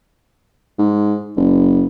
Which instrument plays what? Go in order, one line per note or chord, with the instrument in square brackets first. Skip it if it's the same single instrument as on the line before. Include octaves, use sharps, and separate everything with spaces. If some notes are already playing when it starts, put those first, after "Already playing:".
[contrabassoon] G#2
F#1